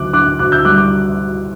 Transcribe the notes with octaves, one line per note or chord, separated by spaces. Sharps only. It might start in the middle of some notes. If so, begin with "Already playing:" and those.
Already playing: D2 F#3 A3 D6 F#6
D3 D6 F#6
D2 D6 F#6
E6 G6
G3 D6 F#6
D6